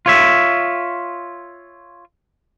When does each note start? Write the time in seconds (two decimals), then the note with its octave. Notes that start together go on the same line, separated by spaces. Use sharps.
0.06 F4 C#5 E5